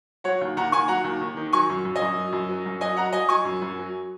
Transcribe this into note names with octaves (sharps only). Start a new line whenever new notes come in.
F#3 C#5 F#5
D#2
D#2 F#5 A#5
D#2 G#5 C#6
F#3 F#5 A#5
D#2
D#2
D#3
F#3 G#5 C#6
F#2
F#2
D#5 G#5
F#2
F#3
F#2
F#3
F#2
F#3 D#5 G#5
F#3 F#5 A#5
F#3 D#5 G#5
F#3 G#5 C#6
F#2
F#2
F#3